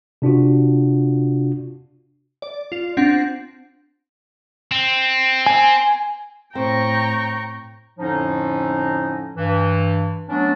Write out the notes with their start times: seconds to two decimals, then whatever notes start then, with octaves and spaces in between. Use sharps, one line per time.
0.22 C3 D4 F4 F#4
2.42 D5
2.72 F4
2.97 C4 D4 F#5 A#6
4.72 C4
5.46 G#5
6.55 A2 C4 G5 A#5 C#6
7.99 F2 A2 D3 F3 C#4 D#4
9.37 G2 E3
10.29 F#3 A3 B3 C#4 D4